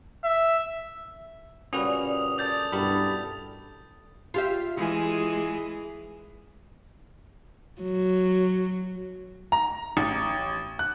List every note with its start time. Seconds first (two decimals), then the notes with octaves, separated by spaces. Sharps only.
0.24 E5
1.73 A#2 C#3 G3 C#4 F#4 B4 D#6 F7
2.38 A4 D5 D#6 G6 A6
2.72 G2 B2 E4 G4 A#4 B5
4.34 F4 G4 E5
4.76 E3 G#3 G#4
7.82 F#3
9.52 A#5
9.97 A1
10.79 F#6